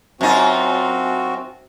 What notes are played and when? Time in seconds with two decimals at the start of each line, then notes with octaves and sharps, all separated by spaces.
0.21 F#2 C4 D#4 F4 F#4